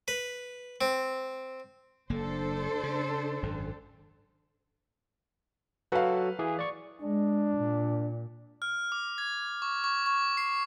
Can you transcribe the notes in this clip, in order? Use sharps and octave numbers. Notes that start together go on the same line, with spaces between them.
B4
C4
F#1 A#3 D4 A4 C5
C#3
G#1 F#2
F#3 F#4 A4 B4 F5
E3 G#4
D5 C#6
G#3 D4
A#2
F6
D6
G#6
C#6
C#6
C#6
C7